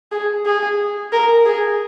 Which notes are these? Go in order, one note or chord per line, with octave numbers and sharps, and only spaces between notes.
G#4
G#4
A#4
G#4